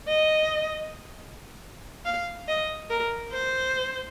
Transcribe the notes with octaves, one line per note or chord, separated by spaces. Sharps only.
D#5
F5
D#5
A#4
C5